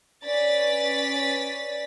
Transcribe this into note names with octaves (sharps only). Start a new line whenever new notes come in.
C#4 B4 D5 A6 B6